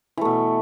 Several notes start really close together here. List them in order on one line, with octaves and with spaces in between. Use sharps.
E3 A3 B2